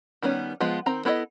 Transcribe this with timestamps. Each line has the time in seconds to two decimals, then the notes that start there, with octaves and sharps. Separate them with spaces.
0.22 D#3 G3 B3 C#4
0.61 F3 G#3 B3 F4
0.86 D#3 C4 A#5
1.05 B3 E4 A4 C5 D#5